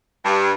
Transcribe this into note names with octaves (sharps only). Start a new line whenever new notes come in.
G2